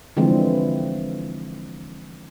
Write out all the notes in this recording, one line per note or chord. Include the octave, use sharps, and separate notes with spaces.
D3 E3 F3 G#3 C4